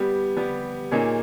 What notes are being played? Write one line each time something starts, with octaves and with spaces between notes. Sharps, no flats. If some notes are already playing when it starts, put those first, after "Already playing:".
Already playing: G3 B3 G4
G3 B3 G4
A#2 A#3 D#4 G#4 C#5